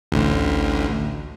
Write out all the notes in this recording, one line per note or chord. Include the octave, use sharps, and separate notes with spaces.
A1 D2